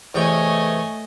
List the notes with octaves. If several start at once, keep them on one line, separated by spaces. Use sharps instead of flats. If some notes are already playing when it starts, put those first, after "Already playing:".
E2 C3 A3 C#5 D#5 G5 G#5